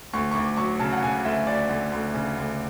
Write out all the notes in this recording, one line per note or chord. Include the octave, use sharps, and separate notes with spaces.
D2 C#6
C#6
D2 D6
F#3 C#6
C#3 A5
F#5
C#3 G#5
D2 E5
D2 D5
D2
D2
C#3
D2